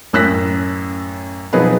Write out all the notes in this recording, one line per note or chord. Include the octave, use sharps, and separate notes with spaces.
A1 F#2 E6 F#6 A#6 B6
B2 F3 F#3 D#4 G#4 B4